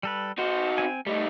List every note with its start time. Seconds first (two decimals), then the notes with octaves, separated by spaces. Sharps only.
0.03 G3 A4 B4
0.39 D#4 F#4 C5
0.78 C4 G#5
1.07 G3 A3 D#4